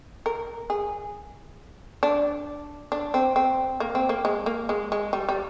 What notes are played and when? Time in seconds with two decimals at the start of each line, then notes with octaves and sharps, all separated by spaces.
0.26 A#4
0.70 G#4
2.03 D4
2.92 D4
3.14 C4
3.36 C4
3.80 A#3
3.95 C4
4.09 A#3
4.25 G#3
4.46 A#3
4.69 G#3
4.92 G#3
5.13 G3
5.29 G3